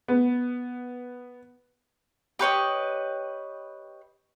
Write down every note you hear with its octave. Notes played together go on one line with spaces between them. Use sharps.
B3
G4 B4 C#5 D#5